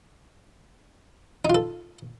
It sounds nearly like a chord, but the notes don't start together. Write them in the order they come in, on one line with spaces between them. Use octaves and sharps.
D#4 F4 A4